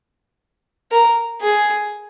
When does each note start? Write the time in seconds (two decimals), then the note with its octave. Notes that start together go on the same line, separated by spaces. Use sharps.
0.91 A#4
1.41 G#4